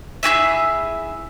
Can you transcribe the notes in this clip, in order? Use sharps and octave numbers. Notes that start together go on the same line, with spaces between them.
E4 F#4 G#4 E5